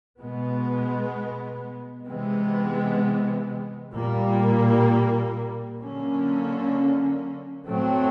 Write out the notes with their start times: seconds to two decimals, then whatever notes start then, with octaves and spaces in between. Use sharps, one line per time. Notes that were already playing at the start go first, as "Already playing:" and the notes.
0.18 B2 G#3 B3
2.06 C3 E3 G#3 B3
3.93 A#2 G3 A#3
5.79 D3 F#3 A#3 C#4
7.67 A2 F#3 A3 C4